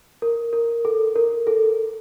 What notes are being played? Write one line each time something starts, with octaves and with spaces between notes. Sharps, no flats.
A#4
A#4
A4
A#4
A4